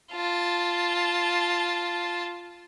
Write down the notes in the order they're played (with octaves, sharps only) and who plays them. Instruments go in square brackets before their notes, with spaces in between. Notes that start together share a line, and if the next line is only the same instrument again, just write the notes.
[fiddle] F4 A5